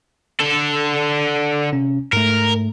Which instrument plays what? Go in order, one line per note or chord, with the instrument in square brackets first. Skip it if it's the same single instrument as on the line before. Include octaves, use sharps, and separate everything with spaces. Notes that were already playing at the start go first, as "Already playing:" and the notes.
[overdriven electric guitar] D3 A4
[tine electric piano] C3 C#4
[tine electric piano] G#2 A3 [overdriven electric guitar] A#4